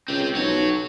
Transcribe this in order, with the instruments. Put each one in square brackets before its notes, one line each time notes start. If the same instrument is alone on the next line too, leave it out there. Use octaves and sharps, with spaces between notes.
[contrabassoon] C#2 [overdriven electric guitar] C4 G4
[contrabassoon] B1 [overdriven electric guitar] F#4 C#5